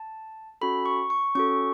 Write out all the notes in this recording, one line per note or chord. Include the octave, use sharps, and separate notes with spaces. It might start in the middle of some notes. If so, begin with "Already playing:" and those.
Already playing: A5
C#4 F#4 A4 B5
C#6
C#6
C#4 F#4 A4 C#6